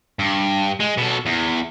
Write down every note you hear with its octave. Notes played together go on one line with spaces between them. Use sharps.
G2
G#3
B2 A4
E2